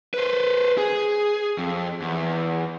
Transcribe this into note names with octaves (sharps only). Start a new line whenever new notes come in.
B4 C5
G#4
F2
E2